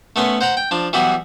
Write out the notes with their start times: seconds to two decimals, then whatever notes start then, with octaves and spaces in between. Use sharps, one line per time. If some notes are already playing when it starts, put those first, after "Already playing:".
0.16 A3 B3 C#4 B4 C6
0.41 C5 F#5 A#5 B5
0.57 G5
0.71 F3 D4
0.93 E3 F#3 G3 B3 F#4